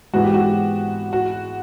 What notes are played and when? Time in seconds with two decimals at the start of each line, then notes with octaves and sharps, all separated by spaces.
0.14 G#2 E3 G#3 B3 F#4
0.24 G4
0.34 F#4
1.13 F#4